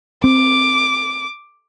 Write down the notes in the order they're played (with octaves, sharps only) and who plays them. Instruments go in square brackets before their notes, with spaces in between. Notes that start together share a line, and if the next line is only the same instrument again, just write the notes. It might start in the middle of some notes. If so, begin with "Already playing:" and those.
[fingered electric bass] C4 [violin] D6